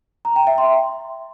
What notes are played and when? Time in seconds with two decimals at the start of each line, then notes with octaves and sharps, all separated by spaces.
0.25 A#5
0.36 G5
0.47 E5
0.58 C6